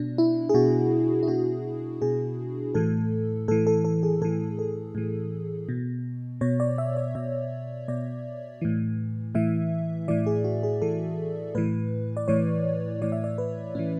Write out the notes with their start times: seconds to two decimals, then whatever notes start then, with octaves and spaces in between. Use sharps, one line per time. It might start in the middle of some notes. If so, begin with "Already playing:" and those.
Already playing: B2 D4
0.18 E4
0.49 G#4
0.54 B2 F#4
1.23 E4
1.28 B2 F#4
2.02 B2 G#4
2.75 A2 E3 A4
3.48 A2 A4
3.51 E3
3.67 A4
3.85 A4
4.03 G#4
4.22 A2 E3 A4
4.59 A4
4.95 A2 E3
5.69 B2
6.41 B2 C#5
6.60 D5
6.78 E5
6.96 D5
7.15 B2 E5
7.88 B2 D5
8.62 A2 E3
9.35 A2 E3 E5
10.08 A2 E3 D5
10.26 G#4
10.44 F#4
10.63 G#4
10.82 A2 E3 A4
11.55 A2 E3 B4
12.17 D5
12.28 A2 E3 C#5
13.02 A2 E3 D5
13.12 E5
13.24 D5
13.38 B4
13.75 A2 E3 C#4